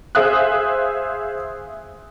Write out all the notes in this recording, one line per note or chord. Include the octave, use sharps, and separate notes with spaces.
G#4 C5 E5 F5 D#6 F#6